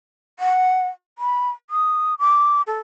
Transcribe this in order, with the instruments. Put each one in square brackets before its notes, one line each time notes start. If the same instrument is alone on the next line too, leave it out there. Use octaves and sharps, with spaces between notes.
[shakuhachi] F#5
B5
D#6
D6
A4